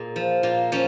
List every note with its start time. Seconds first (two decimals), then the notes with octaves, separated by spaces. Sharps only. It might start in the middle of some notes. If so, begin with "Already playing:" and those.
Already playing: A#2 G#4
0.16 F3
0.43 A#2 F4
0.72 F3 C#4